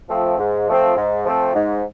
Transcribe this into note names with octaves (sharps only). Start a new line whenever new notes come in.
F3 A3 C4
G#2
F3 A3 C4
G#2
F3 A3 C4
G#2